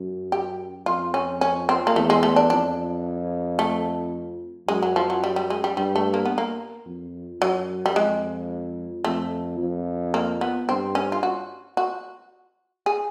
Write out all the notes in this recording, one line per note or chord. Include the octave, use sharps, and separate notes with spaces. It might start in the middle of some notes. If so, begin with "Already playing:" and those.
Already playing: F#2
G4
F2 F4
C#4
C#4
C4
A#3
E2 A3
G#3
A3
D4
F2 D4
A3
F#2 G#3
F#3
F3
F#3
G3
G3
G#3
G3
G2 G3
A3
A#3
B3
A#3
F2
F#2 F#3
G3
F2 G#3
F2 A3
F2
A#3
B3
G2 C4
C#4
F4
F#4
F#4
G#4